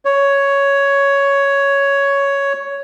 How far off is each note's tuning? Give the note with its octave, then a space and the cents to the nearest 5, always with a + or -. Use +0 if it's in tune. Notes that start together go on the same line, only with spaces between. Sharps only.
C#5 +5